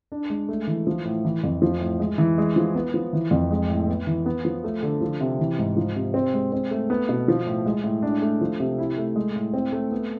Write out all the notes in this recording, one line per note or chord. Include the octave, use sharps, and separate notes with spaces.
D4
G#3
A3
E3
F3
A2
E3
F2
F3
A2
G#3
E3
G#3
F3
B3
F3
E3
F2
G#3
A2
B3
E3
B3
F3
A3
D3
F3
C3
E3
G#2
F3
C3
C4
G#3
C4
A3
B3
B2
F3
A2
G#3
A2
D4
A3
F3
C3
E4
A3
G#3
A2
C4
A3
B3